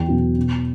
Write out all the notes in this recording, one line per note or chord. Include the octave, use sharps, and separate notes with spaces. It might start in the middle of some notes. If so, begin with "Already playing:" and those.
Already playing: E2 G5
B2 F#3
B2